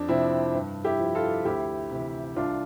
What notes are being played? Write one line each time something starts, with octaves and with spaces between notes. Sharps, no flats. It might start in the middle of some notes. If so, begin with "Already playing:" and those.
Already playing: F2 D4
C3 F3 C4 E4
G2
E4 G4
F3
F4 A4
D2 E4 G4
C3 E3
C2 D4 F4